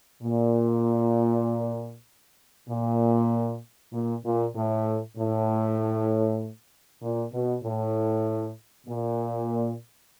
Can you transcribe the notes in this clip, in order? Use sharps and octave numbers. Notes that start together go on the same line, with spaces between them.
A#2
A#2
A#2
A#2
A2
A2
A#2
B2
A2
A#2